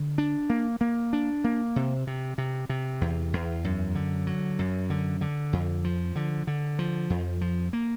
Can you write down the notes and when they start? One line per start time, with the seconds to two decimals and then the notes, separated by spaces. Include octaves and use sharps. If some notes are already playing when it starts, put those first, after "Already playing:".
Already playing: D3
0.18 D4
0.50 A#3
0.81 A#3
1.13 D4
1.44 A#3
1.76 C3
2.07 C3
2.38 C3
2.69 C3
3.01 E2
3.33 E2
3.64 F#2
3.95 D3
4.27 F#3
4.59 F#2
4.90 D3
5.21 D3
5.53 F2
5.84 F3
6.16 D3
6.47 D3
6.79 F3
7.10 F2
7.41 F3
7.73 A#3